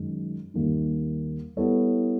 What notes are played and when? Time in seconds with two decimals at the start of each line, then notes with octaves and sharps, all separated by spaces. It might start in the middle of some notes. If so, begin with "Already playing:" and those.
Already playing: F#2 D#3 G#3
0.54 D#2 D#3 G3 A#3 D#4
1.57 G3 B3 E4 A4 C#5